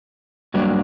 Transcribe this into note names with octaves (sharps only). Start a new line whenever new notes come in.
G2 F#3 A#3 D4